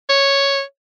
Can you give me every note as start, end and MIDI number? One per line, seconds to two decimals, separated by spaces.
0.09 0.62 73